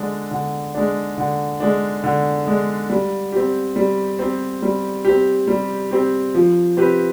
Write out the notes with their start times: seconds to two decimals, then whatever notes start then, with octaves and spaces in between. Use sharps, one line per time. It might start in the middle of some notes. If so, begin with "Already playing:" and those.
Already playing: D3 G#3 D4
0.31 D3
0.75 G#3 D4
1.18 D3
1.60 G#3 D4
2.04 D3
2.47 G#3 D4
2.90 G3
3.32 C4 G4
3.76 G3
4.19 C4 G4
4.62 G3
5.05 C4 G4
5.48 G3
5.91 C4 G4
6.35 F3
6.77 C4 G4 B4